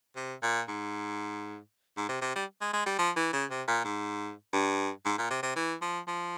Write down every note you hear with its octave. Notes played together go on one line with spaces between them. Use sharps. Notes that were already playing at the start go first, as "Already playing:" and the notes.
C3
A#2
G#2
G#2
C3
C3
G3
G#3
G#3
G3
F3
E3
C#3
C3
A#2
G#2
G2
G#2
A#2
C3
C3
E3
F3
F3